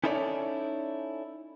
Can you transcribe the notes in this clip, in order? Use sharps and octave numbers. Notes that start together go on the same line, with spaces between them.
C#4 D#4 E4 A4 C#5 D5